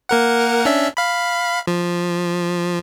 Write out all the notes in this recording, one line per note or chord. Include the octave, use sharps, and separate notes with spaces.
A#3 A#4 F#5
C#4 D4 E5
F5 B5
F3